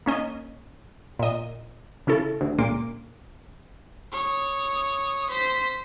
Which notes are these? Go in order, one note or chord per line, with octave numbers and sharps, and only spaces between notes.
A#3 C#4 D#5
A#2 D#5
C#3 C#4 E4 A4
D2
C#2 A#2 A#3 C6 D6
C#5 D#6
C5 B6